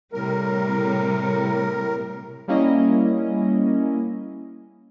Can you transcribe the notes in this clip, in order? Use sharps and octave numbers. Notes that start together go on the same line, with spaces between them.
A2 C3 G3 A#4
G3 A#3 C#4 E4 D#5